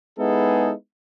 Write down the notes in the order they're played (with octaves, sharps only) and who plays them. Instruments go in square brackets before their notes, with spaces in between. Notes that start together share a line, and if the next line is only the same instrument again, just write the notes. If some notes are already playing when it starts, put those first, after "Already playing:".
[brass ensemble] G#3 B3 D#4 E4 G#4 A4